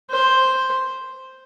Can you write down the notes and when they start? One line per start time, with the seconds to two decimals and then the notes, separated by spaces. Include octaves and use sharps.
0.10 C5